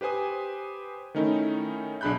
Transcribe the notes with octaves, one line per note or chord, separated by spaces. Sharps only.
G4 B4 C5 G#5 D#6
D#3 A3 C#4 D#4 E4
B1 D4 G#4 B5 F#6 G6